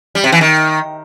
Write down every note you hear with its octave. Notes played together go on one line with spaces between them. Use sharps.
G3
C3
E3
D#3